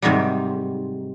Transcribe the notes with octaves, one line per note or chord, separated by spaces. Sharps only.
G#2 C3 D#3 F#3 G3